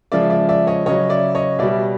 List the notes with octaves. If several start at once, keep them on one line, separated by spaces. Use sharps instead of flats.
C#3 F3 G#3 D5 E5
D5 E5
D5 E5
C#5 D#5
C#3 F#3 C#5 D#5
D5 E5
C#5 D#5
B2 G3 D5 E5